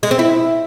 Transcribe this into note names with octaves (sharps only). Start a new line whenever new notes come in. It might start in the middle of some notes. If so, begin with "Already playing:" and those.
G#3
C4
E4